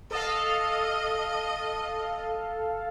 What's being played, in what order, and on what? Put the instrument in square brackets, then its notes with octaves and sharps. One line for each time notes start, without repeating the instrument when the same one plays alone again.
[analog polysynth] A4 F5 [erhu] D#5